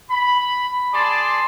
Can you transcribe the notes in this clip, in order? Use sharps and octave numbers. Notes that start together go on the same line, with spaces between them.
B5
G#4 D5 A5 C6